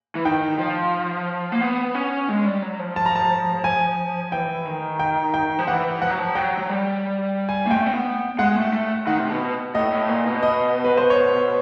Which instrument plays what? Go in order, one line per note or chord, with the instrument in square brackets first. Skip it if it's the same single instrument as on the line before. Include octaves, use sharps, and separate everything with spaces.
[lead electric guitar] E3
[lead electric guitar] D#3 [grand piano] G5
[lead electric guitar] F3
A#3
B3
C#4
G#3
G3
F#3
F3
[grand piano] A5
A#5
A5
G#5
[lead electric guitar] E3 [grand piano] G5
[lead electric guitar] D#3
[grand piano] G5
G5
[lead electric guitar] F3
[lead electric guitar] E3 [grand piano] F#5
[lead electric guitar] F3 [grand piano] F#5
[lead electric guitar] F#3
F3
[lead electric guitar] F#3 [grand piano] G5
[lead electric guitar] F#3
G3
[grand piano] G#5
[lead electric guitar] A#3
[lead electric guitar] A3 [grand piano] G5
[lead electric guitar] C4
B3
[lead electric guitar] G#3 [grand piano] F#5
[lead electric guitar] A3
A3
[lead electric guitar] D#3 [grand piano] F#5
[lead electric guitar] C3
B2
[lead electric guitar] A2 [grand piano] D#5
[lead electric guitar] A2
A#2
B2
[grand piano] D#5
B4
C5
C#5